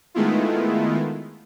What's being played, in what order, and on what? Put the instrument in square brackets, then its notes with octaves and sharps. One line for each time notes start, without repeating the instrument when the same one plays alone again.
[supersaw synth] D#3 G#3 A3 B3 E4 F4